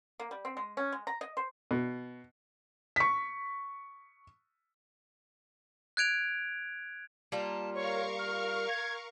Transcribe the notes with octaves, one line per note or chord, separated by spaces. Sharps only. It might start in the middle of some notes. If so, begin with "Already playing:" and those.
A#3
G3
C4
G#3
C#4
G#3
A#5
D#5
C5
B2
C#6 B6
F#6 G#6 D7 F7
G3 A#3 F4 A5
A#4 C#5 F5 C#6
F6
G#6